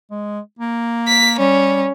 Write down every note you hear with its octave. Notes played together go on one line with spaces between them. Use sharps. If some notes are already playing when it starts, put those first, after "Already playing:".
G#3
A#3
B6
G3 C#4